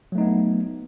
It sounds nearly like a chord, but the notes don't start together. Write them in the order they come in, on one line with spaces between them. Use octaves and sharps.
F#3 A3 D#4 B3